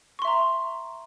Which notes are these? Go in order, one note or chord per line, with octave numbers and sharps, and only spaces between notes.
E5 A#5 C6 C#6